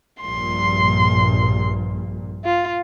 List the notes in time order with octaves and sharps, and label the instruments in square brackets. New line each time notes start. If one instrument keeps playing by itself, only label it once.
[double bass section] A#1 G2 A#2 [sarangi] C6
[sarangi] F4